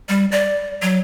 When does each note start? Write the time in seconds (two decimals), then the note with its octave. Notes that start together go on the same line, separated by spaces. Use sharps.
0.09 G3
0.32 D5
0.82 F#3